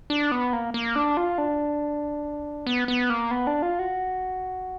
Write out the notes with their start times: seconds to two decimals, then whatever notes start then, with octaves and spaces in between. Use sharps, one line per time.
0.10 D4
0.32 B3
0.53 A#3
0.74 A#3
0.96 D4
1.17 F4
1.38 D4
2.67 B3
2.88 B3
3.10 A#3
3.31 B3
3.47 D4
3.62 F4
3.79 F#4